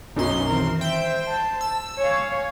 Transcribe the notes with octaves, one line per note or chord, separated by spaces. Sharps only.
B1 F#2 C#4 D#4 C6
D#3 E3 C4 A#4
C5 E5 G5
A5
E6
C#5 F5 G#5